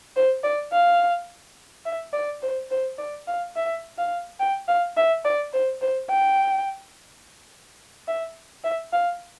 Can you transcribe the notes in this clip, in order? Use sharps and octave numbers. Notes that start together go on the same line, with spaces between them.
C5
D5
F5
E5
D5
C5
C5
D5
F5
E5
F5
G5
F5
E5
D5
C5
C5
G5
E5
E5
F5